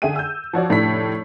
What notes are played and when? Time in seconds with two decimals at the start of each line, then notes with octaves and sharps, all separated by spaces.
0.02 D3 G#4 E5 G5 D#7
0.16 E6 G6
0.53 F3 F#4 C#5 D5
0.69 F1 A2 D4 E4 B6